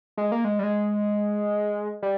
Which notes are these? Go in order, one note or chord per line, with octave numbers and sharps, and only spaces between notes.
G#3
A#3
G#3
G3
G#3
G3